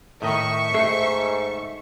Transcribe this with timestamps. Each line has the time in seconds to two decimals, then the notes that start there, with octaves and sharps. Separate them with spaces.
0.22 A2 D#3 D#5 E5 C#6
0.74 G#2 A3 A4 C7